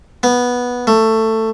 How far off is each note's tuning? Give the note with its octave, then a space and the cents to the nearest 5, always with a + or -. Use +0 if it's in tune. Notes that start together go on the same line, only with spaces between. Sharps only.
B3 -10
A3 +15